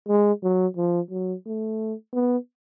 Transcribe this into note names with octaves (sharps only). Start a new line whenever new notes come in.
G#3
F#3
F3
F#3
A3
B3